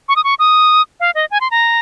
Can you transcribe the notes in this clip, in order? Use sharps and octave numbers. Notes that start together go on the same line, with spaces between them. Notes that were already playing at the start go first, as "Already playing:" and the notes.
C#6
D#6
C#6
D#6
F5
D#5
G#5
C6
A#5